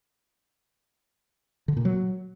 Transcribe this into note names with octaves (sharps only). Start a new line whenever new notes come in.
D3
A#2
F#3